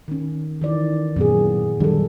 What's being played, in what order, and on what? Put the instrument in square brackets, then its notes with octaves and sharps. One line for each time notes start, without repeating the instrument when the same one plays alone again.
[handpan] D#3 C#4
D#3 E3 D5
[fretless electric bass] F#2 [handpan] A#2 B3 G#4
[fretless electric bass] D#3 F#3 D4 [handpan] G3 A4